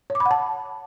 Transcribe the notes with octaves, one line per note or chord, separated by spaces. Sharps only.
C#5
D6
B5
F#5
A5